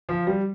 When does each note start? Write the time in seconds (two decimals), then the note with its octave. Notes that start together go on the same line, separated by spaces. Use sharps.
0.09 F3
0.27 G3